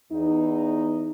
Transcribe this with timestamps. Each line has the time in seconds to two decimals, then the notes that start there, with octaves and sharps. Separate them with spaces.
0.13 E2 B3 D#4